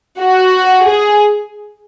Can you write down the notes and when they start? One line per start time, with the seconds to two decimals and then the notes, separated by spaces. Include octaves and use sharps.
0.19 F#4
0.86 G#4